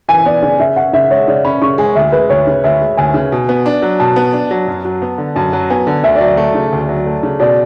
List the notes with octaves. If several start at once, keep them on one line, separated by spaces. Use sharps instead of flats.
E3 G#5
B3 D5
C#3 D5
C#3 E5
C#4 F#5
C#3 E5
G#3 C#5
C#3 D5
C#4 B5
C#3 C#6
G#3 G#5
D2 E5
G#3 B4
D2 C#5
C#3
D2 E5
G#3
D2 G#5
C#3
B2
B3
D4
F#3
B2 A5
B3
D4
F#3
F#2
F#3
B3
D3
F#2 A5
F#3
B3 G#5
D3
D2 E5
D5
F#3
E5
A3
C#3
D2
F#3
A3
C#3
B2 D5